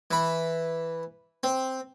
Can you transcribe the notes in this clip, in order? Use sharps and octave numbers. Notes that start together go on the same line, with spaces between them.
E3 B5
C4